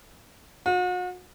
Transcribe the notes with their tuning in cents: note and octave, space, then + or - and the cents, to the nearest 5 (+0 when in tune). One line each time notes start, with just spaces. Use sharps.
F#4 -40